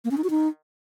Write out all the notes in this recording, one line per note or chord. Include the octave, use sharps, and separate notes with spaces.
A#3
C#4
D#4
F#4
D#4